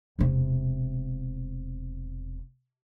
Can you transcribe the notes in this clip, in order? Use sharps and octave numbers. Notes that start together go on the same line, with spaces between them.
E1 C3